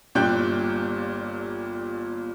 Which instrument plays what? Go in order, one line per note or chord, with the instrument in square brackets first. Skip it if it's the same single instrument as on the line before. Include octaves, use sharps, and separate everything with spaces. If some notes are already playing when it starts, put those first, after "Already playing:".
[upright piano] G1 A#2 G3 G5 F#6 G6